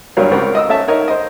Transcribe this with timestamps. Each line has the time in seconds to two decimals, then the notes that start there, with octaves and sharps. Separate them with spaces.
0.17 E2 G2 F#3 A#4 C#5 F5
0.31 C#2 C#3 C4 A#4 D5 F#5
0.55 D#5 D#6 E6
0.69 A3 C#4 E5 A5
0.88 D#4 A#4 C#5 D#5
1.08 C5 D#5